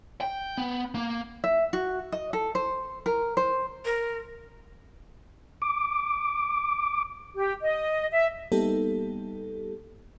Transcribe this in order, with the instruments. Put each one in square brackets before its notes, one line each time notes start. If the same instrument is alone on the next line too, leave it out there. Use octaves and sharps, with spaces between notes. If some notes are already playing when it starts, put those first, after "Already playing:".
[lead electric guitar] G5
B3
A#3
[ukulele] E5
F#4
D#5
A4
C5
A#4
C5
[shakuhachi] A#4
[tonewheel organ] D6
[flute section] G4
D#5
E5
[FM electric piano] G3 A#3 B3 D#4 G4 A4